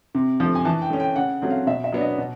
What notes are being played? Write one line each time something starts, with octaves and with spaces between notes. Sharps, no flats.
C3
F3 A3
G#5
E3 A5
G5
A3 C#4
G5
C#3 F#5
F#3 A3 C4
F5
B2 E5
E5
F#3 B3 D4
D#5
B2